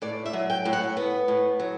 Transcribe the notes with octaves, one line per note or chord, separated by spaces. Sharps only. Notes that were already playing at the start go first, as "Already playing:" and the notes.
A2 D5
E5
F#3
G5
A2
F#5
B3
A2
F#3